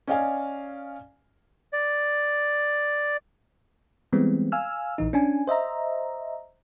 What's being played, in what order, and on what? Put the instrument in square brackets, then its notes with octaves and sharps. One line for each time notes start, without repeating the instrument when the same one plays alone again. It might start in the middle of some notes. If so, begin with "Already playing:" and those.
[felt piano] C#4 D5 D#5 F5 G#5
[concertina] D5
[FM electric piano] E3 G3 G#3 B3 C4
F5 G#5 E6 F6
A#1 E3 D#4
C#4 D4 G#5
C5 D#5 E5 A#5